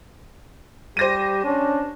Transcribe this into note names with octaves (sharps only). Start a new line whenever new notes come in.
G3 G4 C5 A#6 D#7
C#4 D4